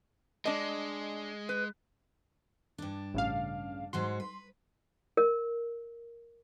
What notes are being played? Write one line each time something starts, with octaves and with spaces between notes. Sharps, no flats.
G#3 D4 D#5
B4
G2 D4
A1 C#3 F5
G#2 F#3 F#4 C6
B4
A#4